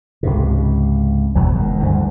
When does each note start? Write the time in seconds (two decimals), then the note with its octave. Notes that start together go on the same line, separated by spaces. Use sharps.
0.23 C#2 G#2 C3
1.35 G#1 E2 B2 E3
1.55 F1 D#3 G#3
1.80 D2 G2 D3 E3